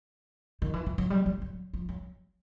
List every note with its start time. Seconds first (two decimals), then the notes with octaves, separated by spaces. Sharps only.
0.62 D#3
0.73 E3
0.86 F3
0.98 F#3
1.10 G3
1.26 F#3
1.42 F#3
1.73 F3
1.89 F#3